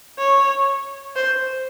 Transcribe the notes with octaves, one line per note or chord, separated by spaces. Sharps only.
C#5
C5